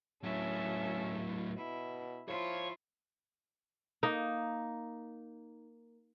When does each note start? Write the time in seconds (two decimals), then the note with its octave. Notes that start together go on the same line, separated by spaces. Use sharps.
0.23 A2 F#3 C#4 A4 E5
1.57 B2 E4
2.28 F3 E4 F4 C#5
4.03 A#3 D#4